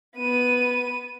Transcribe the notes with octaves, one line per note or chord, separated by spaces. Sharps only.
B3 D#7